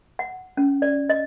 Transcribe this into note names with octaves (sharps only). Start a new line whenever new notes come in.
F#5
C#4
D5
D#5